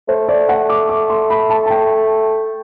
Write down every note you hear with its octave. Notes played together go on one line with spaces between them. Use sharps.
A3 C5
D5
F#5
D6
D6
C6
B5
A5
A5
G5